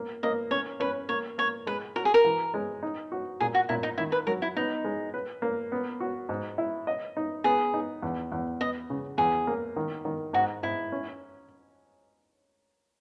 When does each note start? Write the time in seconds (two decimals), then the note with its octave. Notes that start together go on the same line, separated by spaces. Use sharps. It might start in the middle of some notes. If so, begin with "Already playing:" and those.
Already playing: A#3
0.23 A#3 D#5
0.51 C#4 C#5
0.80 C#4 B4
1.09 A#3 C#5
1.38 A#3 C#5
1.67 G#3 B4
1.96 F#4 A#4
2.05 G#4
2.14 A#4
2.24 E3
2.54 G#3
2.83 D#4
3.12 F#4
3.40 A#2 G#4
3.55 F#4
3.69 A#2 E4
3.83 D#4
3.98 D#3 E4
4.12 B4
4.27 F#3 A#4
4.42 E4
4.57 B3 D#4
4.84 G#3
5.14 B4
5.42 A#3
5.72 B3
6.00 F#4
6.29 G#2
6.58 E4
6.87 D#5
7.17 D#4
7.44 B3 G#4
7.74 D#4
8.03 E2
8.32 E2
8.61 B3 D#5
8.90 C#3
9.18 E2 G#4
9.47 A#3
9.76 D#3
10.05 D#3
10.33 G#2 F#4
10.63 G#2 E4
10.92 C#4